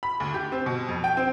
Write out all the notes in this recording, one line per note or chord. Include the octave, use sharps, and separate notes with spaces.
B5
D2
G4
C4
B2
F2
G5
C4